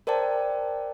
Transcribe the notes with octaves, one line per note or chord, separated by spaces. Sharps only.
A#4 C5 D5 G5 A5